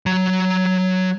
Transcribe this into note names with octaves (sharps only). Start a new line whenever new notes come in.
F#3 A#5